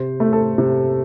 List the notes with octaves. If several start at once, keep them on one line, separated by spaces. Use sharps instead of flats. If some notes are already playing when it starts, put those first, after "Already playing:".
Already playing: C3 C5
A3
A4
C3